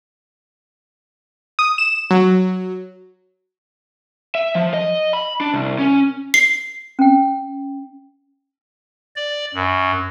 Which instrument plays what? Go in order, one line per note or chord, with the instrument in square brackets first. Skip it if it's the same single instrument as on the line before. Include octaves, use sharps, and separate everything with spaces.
[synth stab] D#6
E7
F#3
[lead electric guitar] E5
F3
D#5
B5
D4
C2
C#4
[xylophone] C7
[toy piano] C#4 G5
[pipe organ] D5
F#2